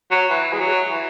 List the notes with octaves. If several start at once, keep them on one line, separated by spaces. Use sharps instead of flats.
F#3
E3
G#3
F#3
E3